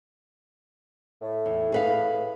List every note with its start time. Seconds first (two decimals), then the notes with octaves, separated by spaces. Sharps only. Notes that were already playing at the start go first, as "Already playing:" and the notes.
1.22 A2
1.46 E2
1.72 G#4 B4 F5